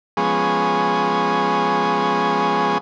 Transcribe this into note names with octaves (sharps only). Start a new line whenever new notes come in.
F3 G#3 B3 C#4 G#4